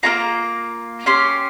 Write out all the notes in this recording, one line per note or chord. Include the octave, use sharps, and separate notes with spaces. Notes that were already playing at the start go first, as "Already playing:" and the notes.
A#3 C#4 F4 A#5
C#4 G4 C6